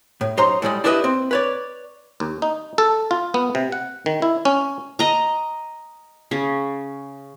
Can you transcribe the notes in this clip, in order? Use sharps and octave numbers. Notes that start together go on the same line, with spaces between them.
A2
F#2 D#4 C5 C#5 A#5 C6
A2 E3 G3 G#3
D4 E4 G4 B4 D5 D#5
C4
B4 C#5 D5
D#2
D#4
A4
F4
B3
C3
F#5
D#3
E4
C#4
D#5 A#5
C#3